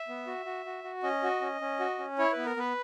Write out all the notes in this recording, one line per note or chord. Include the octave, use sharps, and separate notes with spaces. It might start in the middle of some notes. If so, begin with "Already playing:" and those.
Already playing: E5
B3
F#4
F#4
F#4
F#4
C#4 D#5
F#4
C#4
C#4
F#4
C#4
E4 C#5
B3 B4
A#4
B3 B4